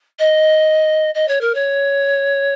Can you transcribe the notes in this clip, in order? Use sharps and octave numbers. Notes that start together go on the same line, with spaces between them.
D#5
D#5
C#5
A#4
C#5